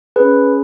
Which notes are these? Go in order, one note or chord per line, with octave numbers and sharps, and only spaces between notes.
C#4 G#4 B4